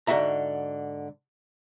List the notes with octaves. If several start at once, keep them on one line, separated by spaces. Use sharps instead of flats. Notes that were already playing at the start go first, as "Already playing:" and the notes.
G#2 D3 F#4 E5 A#5